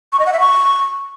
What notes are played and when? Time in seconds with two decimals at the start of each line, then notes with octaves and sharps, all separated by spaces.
0.13 C#6
0.19 D#5
0.26 F#5
0.33 E5
0.40 C#6